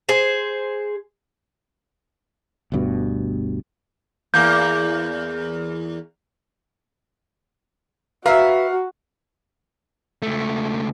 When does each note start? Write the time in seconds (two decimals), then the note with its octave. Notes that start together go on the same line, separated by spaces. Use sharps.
0.09 G#4 C5
2.72 G1 D2 G2 B2
4.34 E2 A#3 G6
8.26 F#4 B4 E5 F5 A#5
10.22 C#2 A3